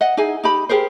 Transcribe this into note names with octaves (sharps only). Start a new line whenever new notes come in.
D#5 F#5
D#4 E4 G#4 G#5
D#4 G4 B5
G4 G#4 A#4 C5